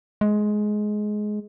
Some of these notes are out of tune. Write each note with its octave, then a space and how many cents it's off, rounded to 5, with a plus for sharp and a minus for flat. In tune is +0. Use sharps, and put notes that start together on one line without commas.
G#3 +15